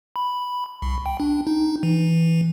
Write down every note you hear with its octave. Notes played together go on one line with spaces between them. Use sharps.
B5
C2
G5
D4
D#4
E3